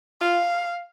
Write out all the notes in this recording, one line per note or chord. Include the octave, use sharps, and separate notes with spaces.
F4 F5